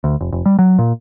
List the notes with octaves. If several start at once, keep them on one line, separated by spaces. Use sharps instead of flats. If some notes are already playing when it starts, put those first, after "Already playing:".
D2
F1
F1
G3
F#3
A#2